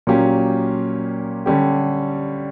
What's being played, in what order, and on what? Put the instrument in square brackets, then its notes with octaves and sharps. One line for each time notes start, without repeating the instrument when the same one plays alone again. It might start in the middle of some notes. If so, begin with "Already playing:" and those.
[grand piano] A#2 F#3 A#3 C#4 G4
D3 G3 C#4 G4